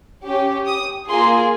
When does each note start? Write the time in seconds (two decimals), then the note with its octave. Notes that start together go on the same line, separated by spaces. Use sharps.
0.24 C#4 G4
0.67 D#6
1.09 A#3 F4 G#4 C6